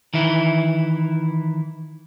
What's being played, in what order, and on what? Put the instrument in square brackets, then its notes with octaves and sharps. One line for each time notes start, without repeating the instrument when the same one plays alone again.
[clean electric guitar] D#3 E3 E4